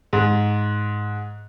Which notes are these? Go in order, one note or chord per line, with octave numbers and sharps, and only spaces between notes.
G#2